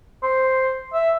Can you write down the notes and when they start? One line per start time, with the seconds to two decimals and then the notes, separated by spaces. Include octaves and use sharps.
0.23 C5
0.94 E5